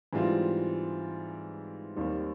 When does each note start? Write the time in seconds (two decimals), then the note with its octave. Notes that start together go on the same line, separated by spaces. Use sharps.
0.13 G#2 E3 G3 C4 F4
1.96 D#2 D#3 G3 C4